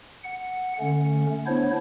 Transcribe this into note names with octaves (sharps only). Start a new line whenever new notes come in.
F#5
D3 A3 C#4
B3 D4 E4 C5 C#5